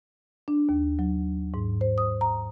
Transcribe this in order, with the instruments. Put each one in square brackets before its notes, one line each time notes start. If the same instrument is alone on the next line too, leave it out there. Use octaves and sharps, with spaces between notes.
[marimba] D4
D#2
F#3
G#2
C5
D#6
A#5